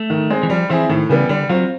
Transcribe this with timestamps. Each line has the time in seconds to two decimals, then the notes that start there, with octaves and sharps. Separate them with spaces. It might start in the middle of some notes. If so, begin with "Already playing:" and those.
Already playing: A3
0.10 D#3
0.30 G#3 C4
0.43 E3
0.50 F3 G3
0.69 E3 C4 E4 G#4
0.89 A2 D#3
1.09 C#3 E3 G3 B3
1.29 D3 G3
1.49 F#3 C4 F4